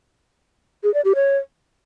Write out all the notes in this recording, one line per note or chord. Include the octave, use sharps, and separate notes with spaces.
G#4
D5
G4
C#5